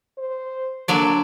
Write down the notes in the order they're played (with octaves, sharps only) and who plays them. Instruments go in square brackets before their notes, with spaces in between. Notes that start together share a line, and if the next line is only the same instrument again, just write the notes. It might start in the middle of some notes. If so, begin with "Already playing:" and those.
[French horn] C5
[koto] D3 F#3 D5 [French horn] A#3